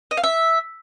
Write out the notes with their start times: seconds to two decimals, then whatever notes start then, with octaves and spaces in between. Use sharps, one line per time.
0.11 D#5
0.17 F5
0.24 E5